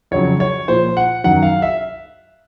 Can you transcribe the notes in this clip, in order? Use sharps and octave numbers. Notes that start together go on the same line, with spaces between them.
F2 C#3 F#3 C#5
C#5
A#2 F3 C5
F#5
F#2 D#3 F#3 F#5
F5
E5